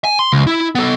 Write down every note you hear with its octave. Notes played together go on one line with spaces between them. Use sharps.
G#5
C6
C#2
E4
B3 A4